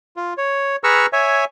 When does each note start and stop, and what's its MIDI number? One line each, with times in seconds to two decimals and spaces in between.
0.17 0.33 65
0.38 0.76 73
0.84 1.06 68
0.84 1.06 71
0.84 1.06 82
0.84 1.06 85
0.84 1.06 88
0.84 1.06 89
1.13 1.45 73
1.13 1.45 76
1.13 1.45 80